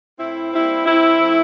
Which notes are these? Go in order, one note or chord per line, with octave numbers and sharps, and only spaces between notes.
A2 C4 E4
G3 A#3 C4 E4
G2 C4 E4
F3 A3 C4